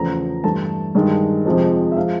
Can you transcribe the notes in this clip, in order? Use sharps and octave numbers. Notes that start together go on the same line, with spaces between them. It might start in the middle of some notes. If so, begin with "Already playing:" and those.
Already playing: E2 C#3 F3 A3 A#5
G2 E3 A3 A5
G2 D#3 G#3
F2 C3 F3 G#3
E5
F3 G#3 F5